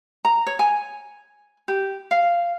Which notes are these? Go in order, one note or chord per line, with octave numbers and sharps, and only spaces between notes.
A#5
C#5
G#5
G4
F5